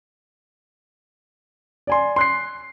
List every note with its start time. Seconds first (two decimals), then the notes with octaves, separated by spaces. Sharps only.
1.87 D5 G#5 C6
2.16 C6 F#6 C7